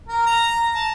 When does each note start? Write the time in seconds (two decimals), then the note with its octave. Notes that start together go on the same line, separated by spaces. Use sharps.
0.08 A#4
0.26 A#5
0.75 A5